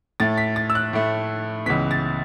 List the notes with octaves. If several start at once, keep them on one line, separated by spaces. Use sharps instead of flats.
A2 A3 A6
B6
A6
E6
F#6
A2 A3
C#2 C#3 E3 B3 B6
A6